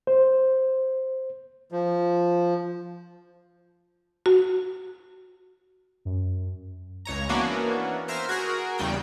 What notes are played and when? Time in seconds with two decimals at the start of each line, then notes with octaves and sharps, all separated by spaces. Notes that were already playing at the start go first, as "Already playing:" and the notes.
0.07 C5
1.72 F3
4.26 F#4
6.05 F#2
7.05 C#2 C#5 A#5
7.29 E3 A#3 B3 C#4 D4 F#4
8.08 A#4 C5 E5 G#5 F6
8.29 F#4 G#4 A#4
8.78 E2 C#3 G3 G5 G6